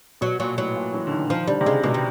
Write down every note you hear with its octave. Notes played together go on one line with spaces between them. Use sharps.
B2 F#3
A#2 F#3
A2 F#3
A#2
E3
D3
D#3
D#3 F3
D3 G3
C3
C#3 G#3
B2 G#3
G3